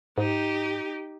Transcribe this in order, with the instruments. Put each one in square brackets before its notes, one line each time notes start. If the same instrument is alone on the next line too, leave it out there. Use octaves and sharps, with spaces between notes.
[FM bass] G#2 [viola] D#4 G4